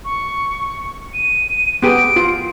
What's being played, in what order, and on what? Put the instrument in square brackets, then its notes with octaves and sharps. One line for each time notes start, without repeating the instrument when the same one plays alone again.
[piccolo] C#6
D#7
[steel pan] B3 G4 G#4 [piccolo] D7
[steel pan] F4